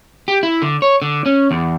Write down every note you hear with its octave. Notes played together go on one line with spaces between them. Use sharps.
G4
E4
D3
C#5
D3
C#4
E2